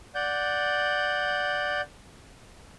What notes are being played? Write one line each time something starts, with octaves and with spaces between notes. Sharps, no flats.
D5 F#5 G6